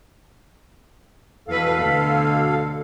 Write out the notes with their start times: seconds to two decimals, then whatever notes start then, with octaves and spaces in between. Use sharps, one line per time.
1.48 E2 B2 A4 B4 F5
1.82 D2 D3